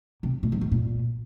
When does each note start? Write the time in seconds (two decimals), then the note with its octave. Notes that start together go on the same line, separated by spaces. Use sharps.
0.23 C3
0.43 A#2
0.52 G2
0.61 A2
0.72 A#2